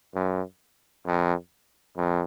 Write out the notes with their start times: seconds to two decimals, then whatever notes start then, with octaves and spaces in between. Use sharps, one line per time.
0.15 F#2
1.06 F2
1.97 F2